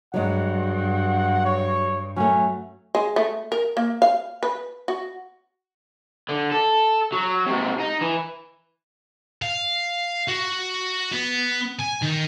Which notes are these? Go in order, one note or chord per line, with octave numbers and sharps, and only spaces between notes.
G2 F#3 G#3 F#5
C#5
F#3 A3 C#4
G#3
A3
A#4
A#3
F5
B4
F#4
D3
A4
F#3
G#2 C3
D#4
E3
F5
F#4
B3
G#5
D#3